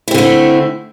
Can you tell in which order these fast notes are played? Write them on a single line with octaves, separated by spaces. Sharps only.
E4 C4 D3 A3